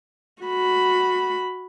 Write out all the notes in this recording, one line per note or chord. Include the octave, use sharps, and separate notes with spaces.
F#4 B5